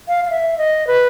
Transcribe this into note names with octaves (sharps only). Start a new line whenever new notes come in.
F5
F5
E5
D#5
B4